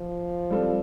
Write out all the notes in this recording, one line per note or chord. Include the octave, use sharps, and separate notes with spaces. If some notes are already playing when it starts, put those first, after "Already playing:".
Already playing: F3
G3 C4 F4 A4